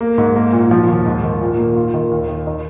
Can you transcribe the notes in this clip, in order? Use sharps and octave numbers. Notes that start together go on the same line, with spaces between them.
A#3
G#2
A#3
A#2
F3
D#2
G#2
D#3
A#2
A#3
F4
D#3
D#2
D#3
D#4